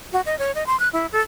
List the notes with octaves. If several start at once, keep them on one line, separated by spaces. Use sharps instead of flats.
F#4
D#5
C#5
D#5
C6
F#6
E4
A4